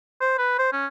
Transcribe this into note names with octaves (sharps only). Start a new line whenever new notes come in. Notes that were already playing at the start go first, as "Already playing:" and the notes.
C5
B4
C5
C#4